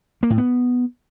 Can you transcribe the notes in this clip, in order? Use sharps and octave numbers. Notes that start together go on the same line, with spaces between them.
A#3
A2
B3